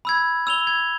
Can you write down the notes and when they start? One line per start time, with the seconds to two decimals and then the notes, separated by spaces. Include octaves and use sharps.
0.05 B5 E6 G#6
0.47 E6 F7 G7
0.67 G#6